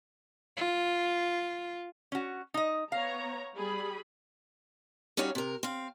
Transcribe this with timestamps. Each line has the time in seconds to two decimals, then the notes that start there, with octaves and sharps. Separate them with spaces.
0.57 F4
2.12 C#4 F#4
2.54 D#4 D#5
2.92 B3 C#5 F5 A#5
3.55 G3 G#4 B5
5.17 G3 C#4 D#4 F#4 C#5 F5
5.35 C3 A#4
5.63 C4 F5